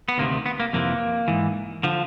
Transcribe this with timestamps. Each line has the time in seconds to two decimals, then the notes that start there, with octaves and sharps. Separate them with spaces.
0.09 B3
0.18 D2 C3 D#3 A#3
0.46 B3
0.60 A#3
0.73 F2 C3 E3 A#3
1.28 G#2 E3
1.83 D3 F3